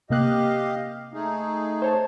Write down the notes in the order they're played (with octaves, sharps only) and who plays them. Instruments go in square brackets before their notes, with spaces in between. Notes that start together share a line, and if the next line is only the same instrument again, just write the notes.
[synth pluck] C3 A#3 F#6 [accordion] G4 D#5 F5
[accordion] A3 D#4 G#4
[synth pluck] C5 C#5 A5